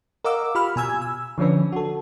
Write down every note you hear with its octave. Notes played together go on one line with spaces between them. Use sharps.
A#4 D#5 F5 F#5 D6 E6
F4 G4 B5 F6
B2 G#5 E6 G#6
E6
D3 F3 C#4 D4 B4
F#4 A4